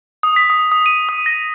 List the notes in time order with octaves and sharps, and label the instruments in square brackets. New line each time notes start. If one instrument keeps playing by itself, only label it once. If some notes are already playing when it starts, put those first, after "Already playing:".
[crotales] D#6
B6
D#6
D#6
D#7
D#6
A#6